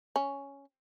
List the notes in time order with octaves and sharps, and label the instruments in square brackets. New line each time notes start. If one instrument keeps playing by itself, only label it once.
[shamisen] C#4